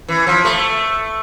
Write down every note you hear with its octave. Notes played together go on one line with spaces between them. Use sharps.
E3
F3
A3